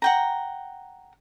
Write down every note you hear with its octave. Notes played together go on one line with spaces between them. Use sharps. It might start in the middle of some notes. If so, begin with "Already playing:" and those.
F#5 G5 A#5